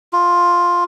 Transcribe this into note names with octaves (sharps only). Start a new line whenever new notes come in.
F4